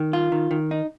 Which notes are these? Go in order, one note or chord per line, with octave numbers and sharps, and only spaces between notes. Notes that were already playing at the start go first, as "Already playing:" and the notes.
Already playing: D#3
F4
D#3
D#3
D#4